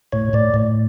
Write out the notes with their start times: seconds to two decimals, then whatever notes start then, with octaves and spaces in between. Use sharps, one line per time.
0.12 A2 C#5
0.33 A2 D5
0.54 A2